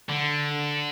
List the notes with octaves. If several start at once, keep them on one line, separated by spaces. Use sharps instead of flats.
D3